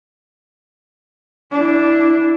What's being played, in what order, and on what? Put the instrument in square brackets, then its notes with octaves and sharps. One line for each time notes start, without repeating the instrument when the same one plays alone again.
[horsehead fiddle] D4 E4